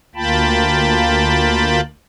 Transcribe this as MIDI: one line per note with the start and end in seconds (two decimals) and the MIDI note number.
0.15 1.81 38
0.15 1.81 58
0.15 1.81 65
0.15 1.81 79
0.15 1.81 81
0.15 1.81 83